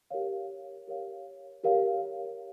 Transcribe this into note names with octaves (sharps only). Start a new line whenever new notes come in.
G4 A#4 C#5 F5
G4 A#4 C#5 F5
G4 A#4 C#5 F5